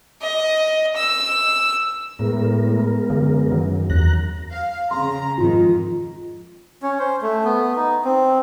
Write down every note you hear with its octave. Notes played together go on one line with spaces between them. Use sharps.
D#5
E6
A2 G#3 B3 A#4
F#2 D3
D#3
E2 A#5 F#6
F5
C#3 A#5 C6
F2 G#2 D#3 F4
C#4
C5
A3
B3
D#4
C4